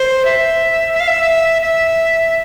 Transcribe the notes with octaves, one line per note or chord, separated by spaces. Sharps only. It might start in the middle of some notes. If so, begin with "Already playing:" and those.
Already playing: C5
E5
E5
F5
E5
E5